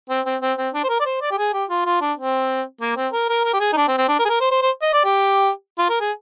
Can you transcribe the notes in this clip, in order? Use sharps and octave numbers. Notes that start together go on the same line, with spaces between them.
C4
C4
C4
C4
D4
C5
A#4
D5
C5
D5
G4
G#4
G4
F4
F4
D4
C4
A#3
C4
A#4
A#4
A#4
G4
G#4
D#4
D4
C4
C4
D4
A#4
G#4
A#4
C5
C5
C5
D#5
D5
G4
F4
A#4
G#4